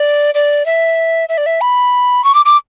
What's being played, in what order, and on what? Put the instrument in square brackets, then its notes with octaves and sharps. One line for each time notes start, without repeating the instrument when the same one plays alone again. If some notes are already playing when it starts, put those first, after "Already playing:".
Already playing: [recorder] D5
D5
E5
E5
D5
E5
B5
C#6
D6
D6